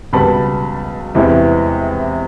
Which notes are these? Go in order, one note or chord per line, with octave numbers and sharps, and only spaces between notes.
C#2 B2 G3 B3 A5 B5
E2 C3 E3 G#3